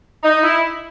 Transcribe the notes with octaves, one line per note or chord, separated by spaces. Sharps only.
D#4
E4